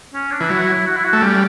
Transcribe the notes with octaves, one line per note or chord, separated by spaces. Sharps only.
C#4
D4
E3
F#3 E4
F#4
E4
F#4
A3
G3 C#4